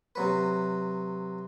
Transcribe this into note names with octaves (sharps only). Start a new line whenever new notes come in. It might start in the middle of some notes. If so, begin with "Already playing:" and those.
C3 F#3 B4